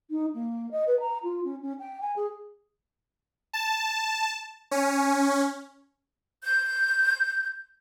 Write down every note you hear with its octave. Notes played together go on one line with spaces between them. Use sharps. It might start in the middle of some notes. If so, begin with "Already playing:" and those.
D#4
A#3
D#5
B4
A#5
F4
C#4
C#4
G5
G#5
G#4
A5
C#4
G6